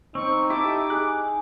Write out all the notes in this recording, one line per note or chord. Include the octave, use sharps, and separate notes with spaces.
C4 D#4 C#6
E4 G4 A4 D6
G#4 F#6